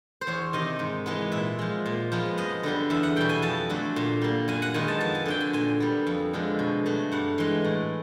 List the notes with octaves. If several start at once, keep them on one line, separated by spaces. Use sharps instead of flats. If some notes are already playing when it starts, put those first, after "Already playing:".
C5
E2 C#5
C3 D#3 D#5
G#2
E3 G#3 B3
A#2 E5
F3 G#3
A#2
F3 G#3 B3
F#2 D#5
D3 G3 B3
E2 E5
F#5
B2 G3 G5
G#5
F2 A5
D3 F#3 A3
A#2
G3 A#3
F#2 G#5
F#5
D#3 G#3 B3 G#5
A5
F2 A5
G#5
D3 F#3 G5
G#5
A#2 G#5
G3 B3
F2
D3 F3 G#3
B2
F#3 A3
G2 F#5
E3 G#3
A2